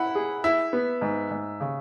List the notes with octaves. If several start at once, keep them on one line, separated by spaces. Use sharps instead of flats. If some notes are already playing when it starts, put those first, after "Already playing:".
Already playing: E4 F#5 B5
G#4
E4 E5
B3
G#2
G#2
C#3